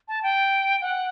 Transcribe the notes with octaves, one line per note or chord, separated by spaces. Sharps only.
A5
G5
F#5